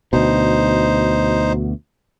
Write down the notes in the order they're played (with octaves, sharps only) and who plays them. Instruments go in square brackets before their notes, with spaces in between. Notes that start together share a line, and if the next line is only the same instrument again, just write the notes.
[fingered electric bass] D2 B2 [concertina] D#4 C5